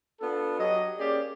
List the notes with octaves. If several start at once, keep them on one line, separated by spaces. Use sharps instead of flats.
B3 D4 F4 A4
F#3 G4 D#5
A#3 C#4 G4 G#4 D5